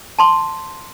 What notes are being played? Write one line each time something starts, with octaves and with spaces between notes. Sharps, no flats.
A5 C6